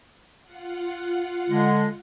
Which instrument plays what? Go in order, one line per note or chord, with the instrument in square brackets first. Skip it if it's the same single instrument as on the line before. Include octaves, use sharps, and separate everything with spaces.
[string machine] F4 F#5
[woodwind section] D3 G#3